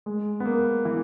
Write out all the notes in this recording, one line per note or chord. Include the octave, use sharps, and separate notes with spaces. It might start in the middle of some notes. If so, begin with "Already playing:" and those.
G#3
B3
A#3
E3